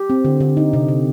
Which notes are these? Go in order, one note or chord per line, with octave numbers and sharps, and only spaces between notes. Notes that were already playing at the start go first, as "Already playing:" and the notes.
Already playing: G4
C4
D3
D3
D#4
C3
C3